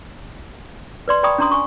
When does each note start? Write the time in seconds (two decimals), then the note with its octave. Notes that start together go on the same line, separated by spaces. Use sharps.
1.08 B4 D5 C6
1.23 D5 G5 A#5 B5 C#6 D#6
1.38 C#4 D4 A#5 C6 D#6
1.51 G#5 C#6